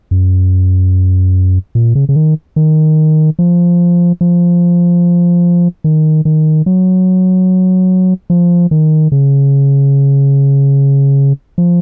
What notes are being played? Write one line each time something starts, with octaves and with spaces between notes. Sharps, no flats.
F#2
A#2
C#3
C#3
D#3
D#3
F3
F3
D#3
D#3
F#3
F3
D#3
C#3
F3